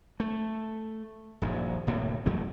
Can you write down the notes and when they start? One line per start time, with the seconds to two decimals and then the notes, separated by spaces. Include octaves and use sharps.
0.20 A3
1.42 D#1 A#1 G2
1.87 D1 A2 C3 A#3
2.26 E2 F#3 A3 A#3